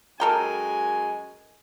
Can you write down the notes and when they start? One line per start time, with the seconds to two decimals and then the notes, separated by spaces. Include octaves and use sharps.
0.20 F#2 G#3 A4 A#4 G5 G#5